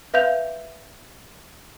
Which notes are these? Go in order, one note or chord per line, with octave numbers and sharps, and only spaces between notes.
B4 E5 F5 G6 F7